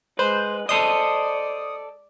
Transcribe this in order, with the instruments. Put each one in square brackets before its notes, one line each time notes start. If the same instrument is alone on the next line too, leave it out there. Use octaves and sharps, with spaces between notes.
[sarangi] G#3 [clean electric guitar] B4 [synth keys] C5
[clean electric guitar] A4 C5 D#5 [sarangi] D5 [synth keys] D#6